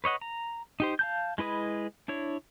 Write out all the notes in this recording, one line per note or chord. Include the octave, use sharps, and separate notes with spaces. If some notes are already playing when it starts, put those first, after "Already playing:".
B4 C#5 D#5 F#5
A#5
D#4 G4 C5
F5 A5 G6
G#3 E4 B4 D#5 B5
D4 E4 C#5